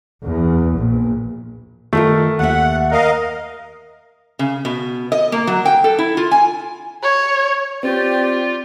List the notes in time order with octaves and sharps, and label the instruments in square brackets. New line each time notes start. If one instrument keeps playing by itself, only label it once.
[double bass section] E2
A#1
[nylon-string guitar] D#3 F4 A#4 [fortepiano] A3
[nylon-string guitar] D#2 E5 [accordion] F#5
[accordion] A#4 D#5 F5
[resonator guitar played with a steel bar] C#3
B2
D#5
A#3
F#3
G5
A4
E4
F4
G#5
[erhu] C#5
[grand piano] C4 [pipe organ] F4 [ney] G4 [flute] D5